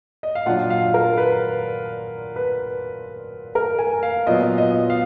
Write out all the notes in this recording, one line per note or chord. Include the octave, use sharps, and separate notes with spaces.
D#5
F5
A#2 F#3 D4 F4 F#5
F5
A#4
B4
B4
A#4
G#5
F5
A#2 F#3 B3 F4 D#5
D#5
F5